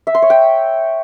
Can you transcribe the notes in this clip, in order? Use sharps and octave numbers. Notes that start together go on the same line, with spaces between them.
E5
C6
C#5
G5